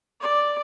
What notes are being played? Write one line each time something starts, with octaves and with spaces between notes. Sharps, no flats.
D5